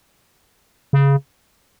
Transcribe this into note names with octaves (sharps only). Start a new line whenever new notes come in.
C#3